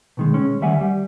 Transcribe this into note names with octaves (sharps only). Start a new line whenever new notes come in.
B2 D#3 G#3
G#3 C#4
D2 D#3 G3 E5 F#5 G#5
G3